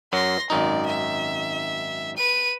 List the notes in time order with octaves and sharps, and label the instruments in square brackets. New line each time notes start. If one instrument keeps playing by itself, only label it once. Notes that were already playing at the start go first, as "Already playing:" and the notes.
[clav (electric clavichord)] F#2 F#3 [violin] C6 A#6
[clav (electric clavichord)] G#1 F#2 D#4 [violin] D5
[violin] E5
B4 D#7